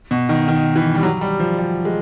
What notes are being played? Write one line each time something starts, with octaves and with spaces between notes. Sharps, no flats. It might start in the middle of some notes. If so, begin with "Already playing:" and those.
B2
D#3
D#3
E3
G3
F#3
G3
F3
G3
G#3